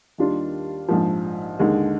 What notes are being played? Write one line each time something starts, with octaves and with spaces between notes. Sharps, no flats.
D#2 D#3 G3 D4 F4
A#1 G#2 F3
D#2 D3 G#3